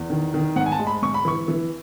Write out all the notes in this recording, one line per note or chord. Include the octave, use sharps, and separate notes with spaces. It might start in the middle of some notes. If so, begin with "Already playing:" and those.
Already playing: E2
D#3
D#3
G#2 F#5
G#5
A5
G#3
B5
G#2 C#6
B5
E3 C#6
E3